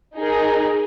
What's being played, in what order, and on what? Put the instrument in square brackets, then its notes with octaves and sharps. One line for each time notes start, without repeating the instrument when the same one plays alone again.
[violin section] D#4 G#4 A#4